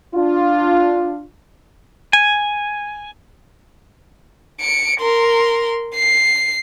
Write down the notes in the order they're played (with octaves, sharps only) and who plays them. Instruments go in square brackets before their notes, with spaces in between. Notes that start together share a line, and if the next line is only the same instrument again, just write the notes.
[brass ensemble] D4 F4
[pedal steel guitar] G#5
[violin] C#7 D7
A#4 C6
C7